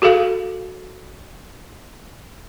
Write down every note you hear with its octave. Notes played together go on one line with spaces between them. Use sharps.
F#4 G#4 A4 F5